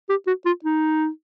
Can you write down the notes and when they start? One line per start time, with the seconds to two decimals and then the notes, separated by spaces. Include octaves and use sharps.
0.09 G4
0.27 F#4
0.46 F4
0.64 D#4